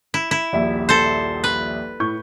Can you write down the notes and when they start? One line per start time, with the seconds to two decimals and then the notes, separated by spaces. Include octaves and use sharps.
0.14 E4
0.31 E4
0.53 D#1 A#1 E5
0.89 A4 C5
1.44 B4
2.00 A2 C#6 G6